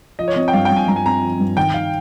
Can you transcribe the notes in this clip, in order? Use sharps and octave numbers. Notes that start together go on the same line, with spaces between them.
F3 D#5
C#5
C4 D#5
G5
G2 F5
G2 G5
G#5
G2 A#5
G#5
C4 A#5
F3
G2
D#3 G5
D#3 F5